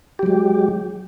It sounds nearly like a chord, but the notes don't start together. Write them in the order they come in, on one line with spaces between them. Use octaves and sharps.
G4 F#3 G#3